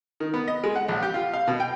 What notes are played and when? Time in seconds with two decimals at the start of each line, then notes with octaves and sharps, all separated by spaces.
0.20 D#3
0.34 B3
0.48 D#5
0.64 G#3
0.76 F#5
0.88 A#1
1.02 G4
1.14 F4
1.33 F5
1.48 B2
1.60 G5